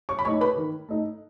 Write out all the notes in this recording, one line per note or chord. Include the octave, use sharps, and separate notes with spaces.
C#5 C#6
B5
A3 D#4 C#5 C#6
B4 B5
D#3
A3 D#4